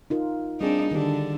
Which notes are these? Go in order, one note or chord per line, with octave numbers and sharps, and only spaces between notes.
D#4 F4 A#4
G3 C4 D4 D#4 G#4
D3 D#3 D4 G4